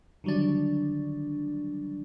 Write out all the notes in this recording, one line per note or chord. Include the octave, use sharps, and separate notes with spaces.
D3 D#3 F#3 G3 D4